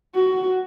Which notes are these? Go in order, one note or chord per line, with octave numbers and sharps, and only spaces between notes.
F#4